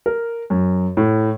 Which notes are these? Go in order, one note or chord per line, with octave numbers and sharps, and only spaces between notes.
A#4
F#2
A2